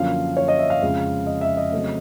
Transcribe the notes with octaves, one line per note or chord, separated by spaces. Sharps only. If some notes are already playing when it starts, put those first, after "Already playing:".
Already playing: F#2 D3 F3 A#3 C#4 F5
C#5
D#5
E5
F5
F2 C#3 F3 G#3
D#5
E5
D#5
C#3 F#3 A3 C4